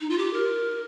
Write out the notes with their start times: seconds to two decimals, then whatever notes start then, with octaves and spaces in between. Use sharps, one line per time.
0.01 D#4
0.10 F4
0.18 G4
0.33 A#4